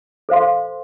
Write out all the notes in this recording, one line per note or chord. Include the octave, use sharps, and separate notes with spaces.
A4 C5 F5 C6